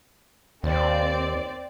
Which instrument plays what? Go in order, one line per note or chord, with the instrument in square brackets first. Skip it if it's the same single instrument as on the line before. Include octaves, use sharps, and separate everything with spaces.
[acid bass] D#2 [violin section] C4 D5